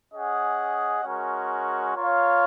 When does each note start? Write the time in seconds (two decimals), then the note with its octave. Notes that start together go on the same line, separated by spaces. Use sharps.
0.12 C#4 G#4 D#5 F#5
1.04 G#3 C#4 F#4 A#4
1.95 F4 A#4 C#5 F5